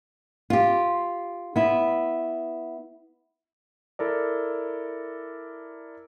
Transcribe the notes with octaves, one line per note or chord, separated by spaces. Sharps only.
F4 G4
B3 E4
E4 A4 A#4 D5